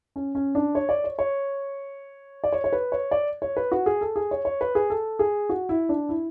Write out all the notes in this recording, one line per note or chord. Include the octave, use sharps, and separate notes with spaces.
C#4
C#4
D4
C#5
D5
C#5
C#5
D5
C#5
C#5
B4
C#5
D5
C#5
B4
F#4
G#4
A4
G#4
C#5
C#5
B4
G#4
A4
G#4
F#4
E4
D4
E4